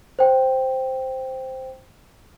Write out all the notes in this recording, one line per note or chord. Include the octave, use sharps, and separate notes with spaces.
C5 G5